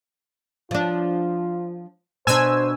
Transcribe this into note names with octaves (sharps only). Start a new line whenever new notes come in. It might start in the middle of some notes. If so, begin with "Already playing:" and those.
F3 D4 F4
B2 D4 C5 G#5 E6